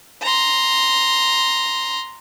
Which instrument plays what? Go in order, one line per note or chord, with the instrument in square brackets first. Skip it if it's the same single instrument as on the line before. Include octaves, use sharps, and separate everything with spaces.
[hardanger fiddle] A#5 C6